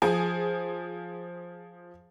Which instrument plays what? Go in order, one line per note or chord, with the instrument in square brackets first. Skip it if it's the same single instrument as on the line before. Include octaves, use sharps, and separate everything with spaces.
[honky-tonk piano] F3 G#4